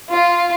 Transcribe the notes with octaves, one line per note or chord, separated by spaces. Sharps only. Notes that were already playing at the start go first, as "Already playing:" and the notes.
F4